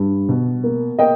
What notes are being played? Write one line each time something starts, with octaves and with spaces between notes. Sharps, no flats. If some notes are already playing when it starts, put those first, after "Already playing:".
Already playing: G2
B2
A#3
A#3 D#5 G5